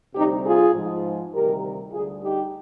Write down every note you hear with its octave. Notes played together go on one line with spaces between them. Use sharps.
D2 C3 G3 D#4 G4
F4 G#4
G#2 F3
D2 C3 D#3 G3 G4 A#4
D2 D3 G3 F4 G#4
D#4 G4